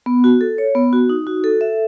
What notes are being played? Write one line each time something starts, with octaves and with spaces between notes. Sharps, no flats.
B3
F#4
A4
C#5
B3
F#4
D#4
F#4
A4
E5